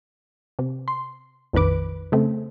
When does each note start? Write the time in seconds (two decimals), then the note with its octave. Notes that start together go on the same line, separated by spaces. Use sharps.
0.59 C3
0.88 C6
1.53 A#1 F2 D#3 B4 D6
2.12 C#3 A3 C4